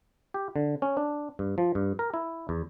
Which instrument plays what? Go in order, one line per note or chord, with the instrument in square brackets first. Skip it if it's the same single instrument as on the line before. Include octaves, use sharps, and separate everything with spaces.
[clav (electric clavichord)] G4
D3
C#4
D4
G2
F3
G2
A#4
E4
E2